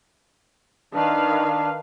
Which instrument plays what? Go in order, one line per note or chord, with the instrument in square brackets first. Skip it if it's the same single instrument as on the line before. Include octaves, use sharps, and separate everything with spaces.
[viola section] D#3 B4 F5 [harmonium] D4